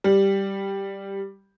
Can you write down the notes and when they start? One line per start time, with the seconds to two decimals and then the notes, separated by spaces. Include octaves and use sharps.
0.04 G3